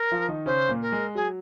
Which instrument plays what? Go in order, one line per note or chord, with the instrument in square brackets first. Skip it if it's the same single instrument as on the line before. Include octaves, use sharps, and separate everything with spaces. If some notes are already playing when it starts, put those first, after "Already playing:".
Already playing: [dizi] A#4
[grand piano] F3 F4
D#3 D#4
[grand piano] C#3 C#4 [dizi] C5
[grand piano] A#2 A#3
[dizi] A#4
[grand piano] G#3
[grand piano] F#3 [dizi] G#4